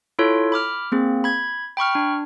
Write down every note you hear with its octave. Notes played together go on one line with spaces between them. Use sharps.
E4 F4 A4 C#5
B5 D6 F6
A#3 C4 G#4
B5 G#6
G5 B5 C#6 F6
D4